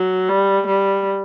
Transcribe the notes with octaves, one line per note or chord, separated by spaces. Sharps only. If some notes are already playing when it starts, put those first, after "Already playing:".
Already playing: F#3
G3
G3